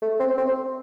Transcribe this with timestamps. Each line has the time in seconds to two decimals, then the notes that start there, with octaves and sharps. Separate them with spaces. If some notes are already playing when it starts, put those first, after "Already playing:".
0.02 A3
0.19 C4
0.38 C4